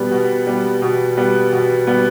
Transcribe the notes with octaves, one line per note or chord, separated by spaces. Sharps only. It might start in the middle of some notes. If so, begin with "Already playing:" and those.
Already playing: B2 G3 B3
B2
G3 B3
B2
G3 B3
B2
G3 B3